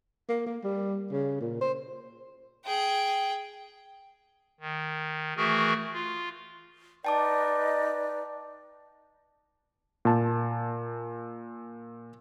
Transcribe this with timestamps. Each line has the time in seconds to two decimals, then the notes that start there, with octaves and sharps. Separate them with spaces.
0.29 A#3
0.46 A#3
0.64 G3
1.12 C#3
1.40 A#2
1.61 C5
2.64 G#4 G5
4.61 D#3
5.37 E3 A3 F#4 G#4 A#4
5.94 F4
7.05 D#4 B4 D5 G5 A5 D6
10.05 A#2 A5